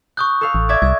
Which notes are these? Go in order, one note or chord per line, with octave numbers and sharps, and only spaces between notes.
C#6 D#6 F#6 G6
A4 F5
A1
D5 E5 G#6
C2 G#6 A#6